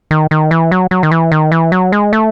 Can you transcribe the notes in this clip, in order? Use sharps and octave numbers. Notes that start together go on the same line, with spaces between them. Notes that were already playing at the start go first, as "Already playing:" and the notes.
D#3
D#3
E3
F#3
F#3
D#3
E3
D#3
E3
F#3
G#3
A3